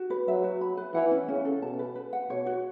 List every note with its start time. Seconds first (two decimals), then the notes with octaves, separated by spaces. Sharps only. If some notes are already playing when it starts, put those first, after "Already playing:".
Already playing: F#4
0.10 B4
0.27 F#3 E5
0.44 F#4
0.61 B5
0.77 B4
0.94 E3 F#5
1.11 C#4
1.28 C#3 C#4
1.45 A4
1.62 B2 A5
1.79 B4
1.95 B4
2.13 F#5
2.30 B2 C#5
2.46 F#4